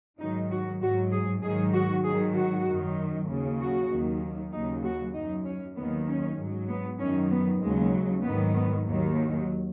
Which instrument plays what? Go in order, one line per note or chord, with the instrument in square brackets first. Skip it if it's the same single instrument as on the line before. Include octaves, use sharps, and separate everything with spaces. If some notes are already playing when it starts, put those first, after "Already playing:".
[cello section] G#2 D#3 F#3 D#4
F#4
G#2 F#3 F#4
G#4
G#2 D#3 F#3 G#4
F#4
G#2 D#3 F#3 G#4
F#4
F#2 D#3 F#3
D#2 C#3 F#3
F#4
D#2 D#3 F#3
D#2 C#3 F#3 D#4
F#4
F#2 F#3 D#4
C#4
D#2 D#3 F#3 B3
C#4
G#2 F#3
B3
F#2 D#3 F#3 C#4
B3
D#2 C#3 F#3 G#3
G#2 D#3 F#3 B3
B3
D#2 D#3 F#3
F#3